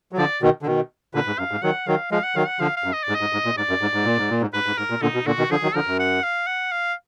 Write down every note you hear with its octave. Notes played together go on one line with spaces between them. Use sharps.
F#3
D3 F3 D5
B2 D#3
D3
B2 D#3
A#2 D3 B4
G#2
F#2 F5
G#2
D#3 F#3 F#5
D#3 F#3 F5
F3 G#3 F5
F#5
D#3 F#3 F5
F#5
D3 F3 F5
F5
F#2
D#5
D5
G#2
D#5
G#2
G#2
A#2
G#2 D5
F#2
G#2
G#2
A#2
G#2
A#2
G#2
G#2 B4
G#2
G#2 A#4
A#2
A#2 D3 D#4
B2
A#2 D3 F#4
B2 D#3
D3 F3 G#4
D#3 F#3
D3 F3 A#4
F#2
F#5
F5
F#5
F5